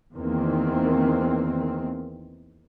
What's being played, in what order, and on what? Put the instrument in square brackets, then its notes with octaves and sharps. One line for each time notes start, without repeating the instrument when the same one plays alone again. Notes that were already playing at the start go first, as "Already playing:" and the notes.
[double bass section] E2 D#3 A#3 C4